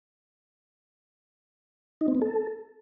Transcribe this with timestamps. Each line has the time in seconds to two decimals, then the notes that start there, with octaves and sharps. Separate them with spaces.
2.01 D#4
2.08 C4
2.15 B3
2.22 A4